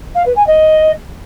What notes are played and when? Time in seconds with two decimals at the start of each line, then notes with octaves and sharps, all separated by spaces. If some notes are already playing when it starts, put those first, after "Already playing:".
0.14 F5
0.25 B4
0.36 G#5
0.46 D#5